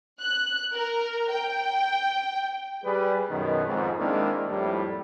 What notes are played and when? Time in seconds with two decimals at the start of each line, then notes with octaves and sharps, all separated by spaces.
0.21 F#6
0.73 A#4
1.32 G5
2.84 G3 G#4 B4
3.30 F#2 B2 D#3
3.66 F2 G#2
3.99 D#3 G#3 A#3 C4 D4 E4
4.48 F2 A2 G3